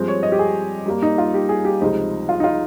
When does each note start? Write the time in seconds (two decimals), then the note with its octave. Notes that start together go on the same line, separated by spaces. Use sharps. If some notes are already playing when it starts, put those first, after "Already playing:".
Already playing: G2 F3 G#3 C4
0.08 C#5
0.23 D#5
0.32 G4
0.39 G#4
0.86 G2 G3 A#3
1.02 D#4
1.18 F4
1.34 G4
1.49 G#4
1.65 G4
1.81 C#2 C3 F3 C4 D#4
2.29 F4
2.40 D#4
2.44 F4